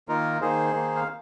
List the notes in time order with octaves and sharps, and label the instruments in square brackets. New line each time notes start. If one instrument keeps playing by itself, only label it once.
[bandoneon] D#3 A#3 D#4 F4 A#4
D#3 A#3 D#4 G#4 C5
D#3 A#3 D#4
F5